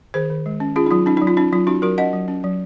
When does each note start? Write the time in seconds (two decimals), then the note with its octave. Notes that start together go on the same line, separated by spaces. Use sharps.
0.14 D#3 G#4 C5
0.30 D#3
0.46 G#3
0.60 C#4
0.76 C#4 F4 G#4
0.86 D#4
0.91 F#3 F4
1.06 C#4 D#4
1.17 D#4
1.22 F#3
1.27 F4
1.37 C#4 D#4
1.52 F#3 F4
1.67 C#4 D#4 F#4
1.82 F#3 F#4 A#4
1.98 C#4 D#5 F#5
2.13 F#3
2.28 C#4
2.44 F#3